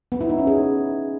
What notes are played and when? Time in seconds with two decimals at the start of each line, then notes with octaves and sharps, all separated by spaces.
0.12 B3
0.21 E4
0.29 D#4
0.38 C#4
0.47 G#4